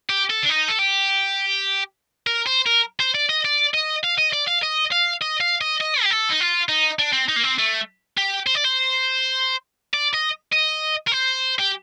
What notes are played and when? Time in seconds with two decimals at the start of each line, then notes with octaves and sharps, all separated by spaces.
0.10 G4
0.30 A4
0.43 D4
0.50 D#4
0.68 A4
0.79 G4
2.27 A#4
2.47 C5
2.67 A#4
3.00 C5
3.15 D5
3.29 D#5
3.45 D5
3.74 D#5
4.04 F5
4.19 D#5
4.33 D5
4.48 F5
4.63 D#5
4.92 F5
5.22 D#5
5.41 F5
5.61 D#5
5.80 D#5
6.03 G4
6.10 A4
6.30 D#4
6.40 F4
6.69 D#4
6.99 D4
7.13 C4
7.29 D#4
7.36 A#3
7.43 C4
7.58 A3
8.17 G4
8.47 C5
8.55 D5
8.65 C5
9.94 D5
10.14 D#5
10.53 D#5
11.07 A#4
11.12 C5
11.59 G4